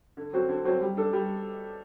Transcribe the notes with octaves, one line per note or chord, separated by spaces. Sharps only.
D3
F#3 C4 F#4
D3
F#3 C4 F#4
G3
D4 A4
G3